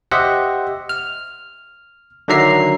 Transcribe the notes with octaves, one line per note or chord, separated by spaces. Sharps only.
G4 C5 D#5 E5 F#5
F6
D3 D#3 F#3 E5 A#5 C7